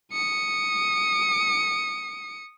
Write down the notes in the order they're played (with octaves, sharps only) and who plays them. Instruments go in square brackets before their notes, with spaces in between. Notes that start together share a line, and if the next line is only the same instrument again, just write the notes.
[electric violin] D#6 C#7